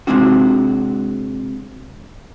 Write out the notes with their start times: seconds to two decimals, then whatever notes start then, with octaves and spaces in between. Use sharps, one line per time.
0.07 C3 E3 G#3 C4 D4 F#4